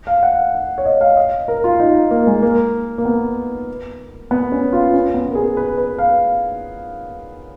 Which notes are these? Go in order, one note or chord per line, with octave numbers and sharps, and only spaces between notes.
F5
F#5
F#5
C#5
D#5
F5
D#5
A#4
F4
D#4
A#3
G#3
A#3
A#3
B3
B3
C#4
F4
C#4
B3
A#4
G#4
B4
B4
F5